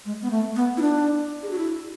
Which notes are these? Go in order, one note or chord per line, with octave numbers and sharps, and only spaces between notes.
G#3
B3
A3
B3
E4
D4
G#4
F#4
E4